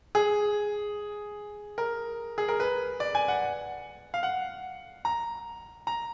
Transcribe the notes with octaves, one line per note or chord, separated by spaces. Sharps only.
G#4
A#4
G#4
A#4
B4
D5
G#5
F#5
F5
F#5
A#5
A#5